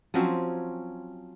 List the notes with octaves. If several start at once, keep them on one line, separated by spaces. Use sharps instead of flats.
F3 F#3 C4 C#4